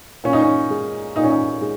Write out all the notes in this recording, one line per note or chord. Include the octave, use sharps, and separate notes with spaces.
A#2 C#4
D#4
C#4
G#3
A#2 D#4
C#4
D#4
G#3